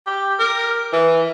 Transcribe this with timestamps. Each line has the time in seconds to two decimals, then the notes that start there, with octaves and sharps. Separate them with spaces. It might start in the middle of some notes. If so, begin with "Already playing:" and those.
0.07 G4
0.39 A#4
0.93 E3